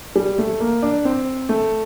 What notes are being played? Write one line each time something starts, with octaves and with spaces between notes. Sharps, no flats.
G3
A3
A#3
D4
C4
A3